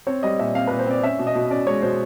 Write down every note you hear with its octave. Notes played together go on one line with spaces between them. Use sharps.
C4 C#5
G3 D#5
A#2 E5
C4 F5
A#2 B4
C5
C4 D5
C#4 E5
B2
D#5
B2
C#4 D5
G#3 C#5
B2 C5